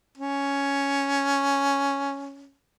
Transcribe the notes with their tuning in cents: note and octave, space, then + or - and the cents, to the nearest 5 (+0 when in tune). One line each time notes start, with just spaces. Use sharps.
C#4 +5